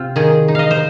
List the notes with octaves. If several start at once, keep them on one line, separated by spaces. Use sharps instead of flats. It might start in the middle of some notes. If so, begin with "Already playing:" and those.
Already playing: C3 C4 F4
D#3 G#4
D#4
D#5 F5
C5